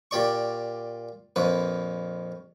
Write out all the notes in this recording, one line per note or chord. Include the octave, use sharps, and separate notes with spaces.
A#2 G4 D5 C#6
A#1 F2 B4